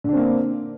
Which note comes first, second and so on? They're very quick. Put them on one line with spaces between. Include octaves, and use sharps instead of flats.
D3 D4 C4 A#3